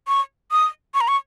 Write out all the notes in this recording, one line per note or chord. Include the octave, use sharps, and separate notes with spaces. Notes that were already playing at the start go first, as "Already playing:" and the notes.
C#6
D#6
C#6
A#5
C#6